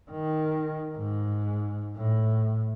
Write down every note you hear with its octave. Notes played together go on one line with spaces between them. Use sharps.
D#3
G#2
A2